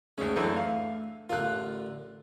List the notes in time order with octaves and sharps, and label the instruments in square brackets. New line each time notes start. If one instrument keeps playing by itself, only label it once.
[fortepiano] D2 C#4 [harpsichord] D#3 G#3
[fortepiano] F#2 E3 D4 [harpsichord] A3
[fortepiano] F5
[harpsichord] A1 D3 A#4 [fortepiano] F4 F#6